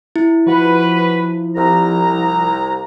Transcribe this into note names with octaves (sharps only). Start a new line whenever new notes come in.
E4
F3 F#4 B4
C2 A#5